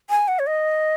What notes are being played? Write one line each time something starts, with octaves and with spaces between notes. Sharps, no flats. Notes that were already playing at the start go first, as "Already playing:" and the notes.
G#5
F#5
C#5
D#5